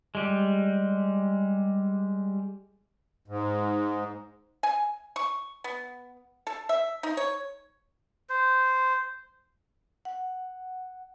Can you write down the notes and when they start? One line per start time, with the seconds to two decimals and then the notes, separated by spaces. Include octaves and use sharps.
0.15 G3 G#3
3.28 G#2
4.63 G#5
5.16 C#6
5.64 B3
6.47 A4
6.69 E5
7.03 D#4
7.17 C#5
8.30 C5
10.05 F#5